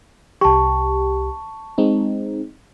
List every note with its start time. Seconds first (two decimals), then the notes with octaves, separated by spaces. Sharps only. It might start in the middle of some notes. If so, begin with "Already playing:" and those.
0.41 C2 G4 A5 C#6
1.78 G#3 C4 D#4